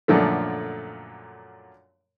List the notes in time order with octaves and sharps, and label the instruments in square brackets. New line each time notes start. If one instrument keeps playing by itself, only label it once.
[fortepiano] F#2 A#2 D3 F3 A3